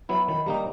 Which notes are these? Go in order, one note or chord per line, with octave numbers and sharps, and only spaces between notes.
F#3 B3 E4 B5
D#3 B5
G3 A#3 D#4 A#5